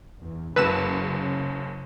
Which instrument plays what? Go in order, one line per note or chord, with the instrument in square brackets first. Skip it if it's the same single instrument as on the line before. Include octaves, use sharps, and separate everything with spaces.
[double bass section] E2
[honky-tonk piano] F#1 F#2 [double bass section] C#3 [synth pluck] B4 E6 E7